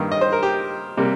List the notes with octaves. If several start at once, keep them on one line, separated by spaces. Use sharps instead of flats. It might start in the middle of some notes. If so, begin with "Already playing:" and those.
Already playing: G2 D#3 A#3
D#5
C5
A#4
G4
C3 G3 A#3